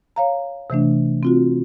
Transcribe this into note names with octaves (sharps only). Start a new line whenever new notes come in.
C#5 F5 A#5
C3 E3 A3 D4
C4 F4 F#4